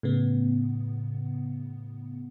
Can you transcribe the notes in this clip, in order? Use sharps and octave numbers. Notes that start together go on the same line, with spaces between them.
A2 C#3 B3